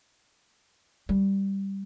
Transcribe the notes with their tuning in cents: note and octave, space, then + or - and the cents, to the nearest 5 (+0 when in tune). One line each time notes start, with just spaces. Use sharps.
G3 +0